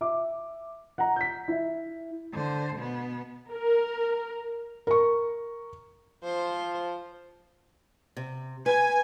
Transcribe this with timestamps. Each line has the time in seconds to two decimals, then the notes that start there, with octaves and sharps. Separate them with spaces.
0.01 E5 D6
0.98 F#5 A#5
1.16 G6 B6
1.48 E4 E5
2.32 D3 C5
2.76 B2 B3
3.51 A#4
4.87 A#4 C#6
6.24 F3 C5
8.17 C3
8.66 B4 G#5